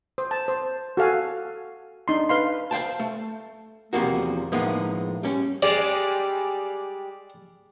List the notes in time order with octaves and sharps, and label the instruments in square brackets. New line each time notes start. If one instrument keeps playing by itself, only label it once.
[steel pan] C5
A5
C5
F#4 A4 F5 G#5
D4 D#4 C6
B4 F5 C6
[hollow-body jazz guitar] C5 F5 G5 A5
A3
E2 C3 F3 A#3 F#4
A2 F3 G#3 A#3 B3 D#4
G3 C#4
[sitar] G3 G#3 G4 [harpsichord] D5